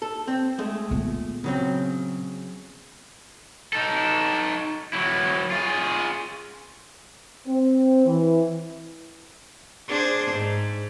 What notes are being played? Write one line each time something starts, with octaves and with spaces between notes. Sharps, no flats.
A4
C4
G#3 A3
A#2 B3
C#3 F#3 C4
D#4 A4
F#3 E4
F4 G#4
C4
E3
D4 G#4 C5
G#2